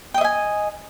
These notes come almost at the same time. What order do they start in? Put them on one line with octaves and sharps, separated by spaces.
G5 D#5 E5 G#5